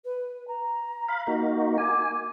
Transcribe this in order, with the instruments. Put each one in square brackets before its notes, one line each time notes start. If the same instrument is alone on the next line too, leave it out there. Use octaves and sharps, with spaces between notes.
[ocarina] B4
A#5
[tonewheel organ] F5 B5
A#3 D#4 F#4
[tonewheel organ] G#5 [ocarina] D6